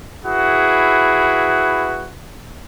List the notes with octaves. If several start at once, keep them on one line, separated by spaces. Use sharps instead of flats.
E4 F#4 G#4 B4